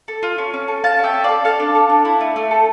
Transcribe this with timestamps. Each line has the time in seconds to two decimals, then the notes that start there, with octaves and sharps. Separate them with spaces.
0.08 A4
0.23 F4
0.38 C#4
0.54 C#4
0.68 A4
0.84 F4 F5 A5
0.98 C#4
1.04 E5 G5
1.14 C#4
1.24 A4 D5 F5
1.44 A4 F5 A5
1.60 D4
1.75 A4
1.89 D4
2.05 E4
2.21 A3
2.36 A3
2.51 A4